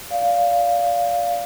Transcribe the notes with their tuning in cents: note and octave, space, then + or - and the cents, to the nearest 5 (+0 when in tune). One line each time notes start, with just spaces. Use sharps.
D5 -20 F5 +0